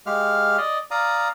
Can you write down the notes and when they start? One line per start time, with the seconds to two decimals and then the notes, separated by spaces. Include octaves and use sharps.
0.06 G#3 G4 F5 F6
0.58 D5 D#5
0.91 D5 F5 A#5 D#6